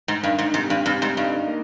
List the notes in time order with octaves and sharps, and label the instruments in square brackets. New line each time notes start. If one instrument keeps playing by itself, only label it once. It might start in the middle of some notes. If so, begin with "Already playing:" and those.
[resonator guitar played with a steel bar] G#2
[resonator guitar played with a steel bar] G2 [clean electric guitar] D#3
[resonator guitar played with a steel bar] G#2
[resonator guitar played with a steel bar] G#2 [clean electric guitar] C3
[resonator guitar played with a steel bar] G2
[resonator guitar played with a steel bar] G2 [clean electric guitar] C3
[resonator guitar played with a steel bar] G#2
[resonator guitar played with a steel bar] G2 [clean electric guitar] D#4
[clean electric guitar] A#3